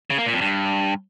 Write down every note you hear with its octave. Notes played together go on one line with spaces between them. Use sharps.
C#3
A#3
A#2
F2
G2